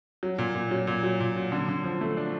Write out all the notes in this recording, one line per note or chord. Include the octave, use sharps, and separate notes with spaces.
F#3
A#2
A#2
F#3
A#2
F#3
A#2
F#3
D3
D3
F3
A3
D4